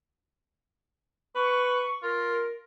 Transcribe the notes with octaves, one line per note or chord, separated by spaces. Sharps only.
B4 C#6
F4 A#4